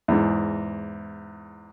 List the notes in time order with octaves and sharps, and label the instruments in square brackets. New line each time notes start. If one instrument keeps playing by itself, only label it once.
[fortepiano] E2 G#2